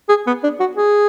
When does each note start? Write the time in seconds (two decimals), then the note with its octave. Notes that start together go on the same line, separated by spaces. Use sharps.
0.09 G#4
0.27 B3
0.43 D4
0.60 F#4
0.77 G#4